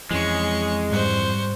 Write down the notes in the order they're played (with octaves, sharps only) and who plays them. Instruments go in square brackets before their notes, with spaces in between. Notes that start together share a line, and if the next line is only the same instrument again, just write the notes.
[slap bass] F2 E3 [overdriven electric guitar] G#3 [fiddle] C#4 C#6
[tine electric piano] G#2 G3 F#6 [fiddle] C5 C#6